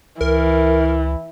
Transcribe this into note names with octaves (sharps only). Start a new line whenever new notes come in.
C#2 E3 A#4